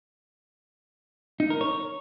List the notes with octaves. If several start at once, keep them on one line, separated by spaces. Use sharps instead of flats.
D#4
A#4
C#5